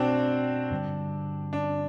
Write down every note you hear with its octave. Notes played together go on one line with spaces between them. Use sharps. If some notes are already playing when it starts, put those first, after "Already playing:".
Already playing: B2 A3 C4 D4 F#4
G2 D3 G3
D4